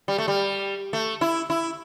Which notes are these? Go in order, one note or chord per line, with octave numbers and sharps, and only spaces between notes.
G3
A3
G3
A3
E4
E4